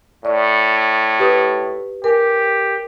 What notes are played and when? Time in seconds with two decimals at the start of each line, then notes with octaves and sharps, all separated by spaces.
0.25 A2 D5
1.20 G4 B4 D#6
2.04 G4 A#4 G#5